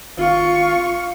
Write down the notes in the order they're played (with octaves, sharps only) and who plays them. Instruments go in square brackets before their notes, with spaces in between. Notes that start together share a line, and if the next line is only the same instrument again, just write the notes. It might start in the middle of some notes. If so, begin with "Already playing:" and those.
[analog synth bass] G#1 [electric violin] F4 C#6 [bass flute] F5